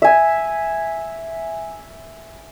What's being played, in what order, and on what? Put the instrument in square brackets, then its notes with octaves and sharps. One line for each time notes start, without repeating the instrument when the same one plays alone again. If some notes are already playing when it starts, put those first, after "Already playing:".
[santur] E5 G#5